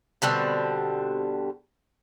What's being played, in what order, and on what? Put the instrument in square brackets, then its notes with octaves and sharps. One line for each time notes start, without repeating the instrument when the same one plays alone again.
[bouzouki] B2 D3 G3 C4